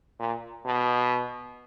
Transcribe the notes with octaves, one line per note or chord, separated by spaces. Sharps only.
A#2
B2